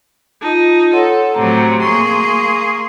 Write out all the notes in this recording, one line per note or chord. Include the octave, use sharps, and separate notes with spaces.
D#4 F4 A5
A4 C#5 F#5 C6
A2 C3 F#3 A#5
A#3 G#4 C6 C#6